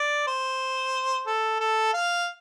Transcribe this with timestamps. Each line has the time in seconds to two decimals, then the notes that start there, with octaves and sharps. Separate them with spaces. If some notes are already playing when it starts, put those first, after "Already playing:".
Already playing: D5
0.27 C5
1.27 A4
1.60 A4
1.94 F5